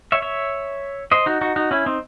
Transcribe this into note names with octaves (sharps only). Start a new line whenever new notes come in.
C#5 E5
C#5 E5
C5 D#5
D#4 F#4
D#4 F#4
D#4 F#4
C#4 E4
C4 D#4